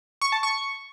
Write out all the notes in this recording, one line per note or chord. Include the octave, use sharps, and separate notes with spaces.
C#6
A5
C#6